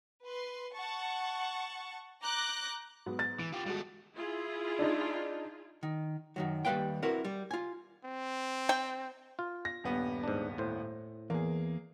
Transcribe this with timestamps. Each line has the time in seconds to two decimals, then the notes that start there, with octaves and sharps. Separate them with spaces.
0.25 B4 C6
0.74 F#5 A5 C#6
2.23 A#5 D6 F#6 G6 A#6
3.06 G#2 F#3 B3
3.19 A6
3.39 E3 D7
3.53 F4 G4
3.66 G3 G#3 F#4 A4
4.14 E4 F4 G#4
4.79 D4 D#4
5.83 D#3
6.36 F#2 D#3 F#3
6.65 D#2 G3 G#3 B4 F5 G5
7.02 C4 E4 F#4 A#4 B4
7.25 G3
7.51 F4 G#5
8.05 C4
8.69 G5
9.39 F4
9.65 A#6
9.84 D#1 G2 B3
10.23 G#2 D4
10.58 A2 C5
11.30 E2 A#3 G#4